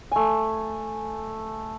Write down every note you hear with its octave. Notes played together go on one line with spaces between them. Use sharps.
A3 G#5